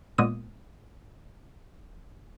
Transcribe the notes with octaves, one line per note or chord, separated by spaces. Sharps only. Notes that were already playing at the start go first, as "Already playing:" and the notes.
A#2 G#3 A#3 B3 D#6 D#7